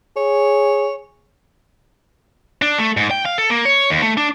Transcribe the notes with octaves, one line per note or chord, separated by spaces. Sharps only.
G#4 C#5
D4
A3
G#2
G5
F5
A4
A#3
C#5
D#2
A3
D4